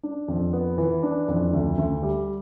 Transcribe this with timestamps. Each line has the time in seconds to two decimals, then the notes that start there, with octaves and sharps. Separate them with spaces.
0.03 D4
0.28 F2
0.53 B3
0.78 E3
1.03 D4
1.28 F2
1.53 D2
1.78 D2
2.03 G3